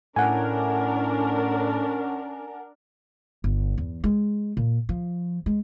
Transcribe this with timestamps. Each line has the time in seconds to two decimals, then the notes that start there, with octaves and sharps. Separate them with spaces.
0.16 A2 C#4 D4 A#4 F#5 G#5
3.44 G1
3.78 E2
4.04 G#3
4.57 A#2
4.89 F3
5.46 G#3